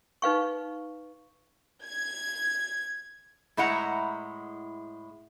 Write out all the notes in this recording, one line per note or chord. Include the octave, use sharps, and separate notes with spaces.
D#4 B4 F5 C#6
G#6
A2 G#3 E4 D#5 F#5 A#5